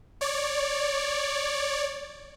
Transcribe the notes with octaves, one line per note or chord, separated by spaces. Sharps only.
C#5 D5